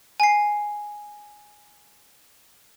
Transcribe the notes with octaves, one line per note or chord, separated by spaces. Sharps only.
G#5 C7